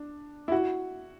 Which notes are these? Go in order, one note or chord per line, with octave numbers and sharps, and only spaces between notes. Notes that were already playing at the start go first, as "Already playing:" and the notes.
Already playing: D4
E4
F#4